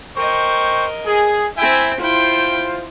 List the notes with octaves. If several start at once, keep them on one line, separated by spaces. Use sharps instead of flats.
A#4 C5 D#5 G5 C#6
G#4
C4 E4 E5 G5 G#5
E4 F4 C5 G5